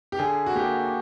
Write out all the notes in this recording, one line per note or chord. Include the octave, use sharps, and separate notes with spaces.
G4
D3 G#4
F#4
A#3 G4